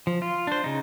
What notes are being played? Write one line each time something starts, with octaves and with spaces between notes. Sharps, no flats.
F3
F4
D4 C5
C#3 D#4